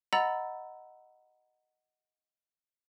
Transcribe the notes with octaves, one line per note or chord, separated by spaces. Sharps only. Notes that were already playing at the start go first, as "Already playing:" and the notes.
D#5 F#5 A#5 B5 E6 A6